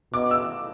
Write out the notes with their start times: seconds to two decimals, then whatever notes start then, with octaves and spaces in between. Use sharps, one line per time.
0.13 B2 D6
0.31 E6